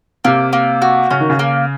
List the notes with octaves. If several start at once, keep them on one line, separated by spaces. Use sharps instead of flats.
C3 A#3
A#3
F#4
C#3 C#4
D#3
C#3
A#3